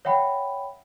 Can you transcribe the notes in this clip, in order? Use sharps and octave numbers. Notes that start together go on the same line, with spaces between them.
C#5 E5 F#5 G5 B5